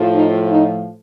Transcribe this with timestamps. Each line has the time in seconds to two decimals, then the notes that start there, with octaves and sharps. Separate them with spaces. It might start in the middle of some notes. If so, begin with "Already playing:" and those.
Already playing: A2 F3
0.14 D#4
0.50 D#4